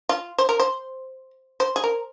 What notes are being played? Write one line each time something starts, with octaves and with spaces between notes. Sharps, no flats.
F4
C5
A#4
C5
C5
G#4
A#4